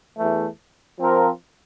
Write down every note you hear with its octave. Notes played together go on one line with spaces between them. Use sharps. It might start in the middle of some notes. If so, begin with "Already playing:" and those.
E2 E3 A3
F3 C4 F4 A#4